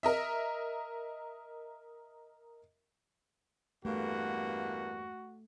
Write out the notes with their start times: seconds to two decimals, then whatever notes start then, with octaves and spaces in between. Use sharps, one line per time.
0.03 A#4 D#5 E5
3.85 E2 G2 A3 A#3 F#4